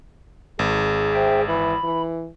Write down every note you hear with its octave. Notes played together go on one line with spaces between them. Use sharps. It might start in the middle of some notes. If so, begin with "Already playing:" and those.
G#1 G#4
C5 E5 G5
E3 B5
E3